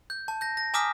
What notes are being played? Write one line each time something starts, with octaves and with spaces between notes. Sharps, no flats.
G6
A5
G6 A#6
A#6
G#5 A#5 D6 D#6 F6 B6